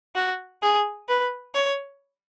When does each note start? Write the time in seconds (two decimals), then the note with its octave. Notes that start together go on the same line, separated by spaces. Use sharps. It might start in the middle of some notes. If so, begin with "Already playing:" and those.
0.15 F#4
0.62 G#4
1.09 B4
1.54 C#5